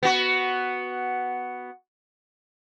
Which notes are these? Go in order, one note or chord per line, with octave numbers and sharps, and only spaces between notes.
B3 F#4